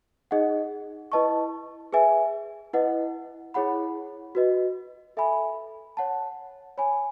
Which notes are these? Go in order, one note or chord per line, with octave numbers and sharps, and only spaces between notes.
D#4 G#4 D#5 F#5
E4 B4 D#5 A5 C#6
G#4 B4 E5 G#5
E4 B4 D#5 F#5
E4 G#4 C#5 F#5 B5
F#4 B4 D#5
A4 E5 G#5 B5
C#5 F#5 A5
C#5 G#5 B5